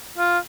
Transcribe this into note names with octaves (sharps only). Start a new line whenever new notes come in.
F4